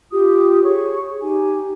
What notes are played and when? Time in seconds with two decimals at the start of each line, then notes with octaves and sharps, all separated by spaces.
0.12 F4 G4 D#6
0.64 G#4 C#5 C#6
1.21 D#4 G4 G#5